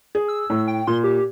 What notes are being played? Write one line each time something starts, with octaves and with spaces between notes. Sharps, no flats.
G#4
E6
A2
G5
A#2 C6
G4